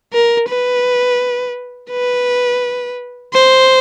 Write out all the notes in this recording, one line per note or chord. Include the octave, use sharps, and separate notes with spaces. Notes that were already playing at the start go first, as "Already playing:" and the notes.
A#4
B4
B4
C5